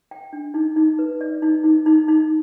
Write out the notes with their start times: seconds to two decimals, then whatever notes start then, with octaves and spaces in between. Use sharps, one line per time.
0.11 G5
0.33 D4
0.54 D#4
0.76 D#4
0.99 B4
1.21 D5
1.42 D#4
1.64 D#4
1.86 D#4
2.08 D#4